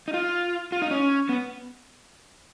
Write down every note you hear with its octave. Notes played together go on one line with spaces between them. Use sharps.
D#4
F4
F4
D#4
C#4
B3